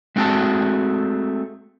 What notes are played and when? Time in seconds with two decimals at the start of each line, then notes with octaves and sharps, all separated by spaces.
0.16 G#3 A3 C4 F#4 G#4 A5